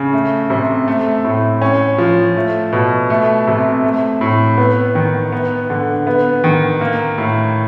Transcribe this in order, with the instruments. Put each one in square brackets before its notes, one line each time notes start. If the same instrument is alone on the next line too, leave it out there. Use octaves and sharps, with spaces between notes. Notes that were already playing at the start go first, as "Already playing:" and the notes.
Already playing: [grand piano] C#3
A3
C3
A3
A2
C#4
F3
A3
B2
A3
C3
A3
A2
B3
D#3
B3
D3
B3
D#3
A#3
A2